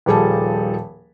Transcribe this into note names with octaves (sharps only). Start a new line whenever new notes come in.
D#1 F3 G3 G#4 A4 A5